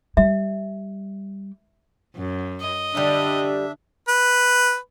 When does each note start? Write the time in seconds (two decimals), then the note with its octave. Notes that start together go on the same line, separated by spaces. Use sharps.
0.17 G3 E5
2.16 F#2
2.61 D#5
2.95 D3 G3 D4 A4 E5
4.08 B4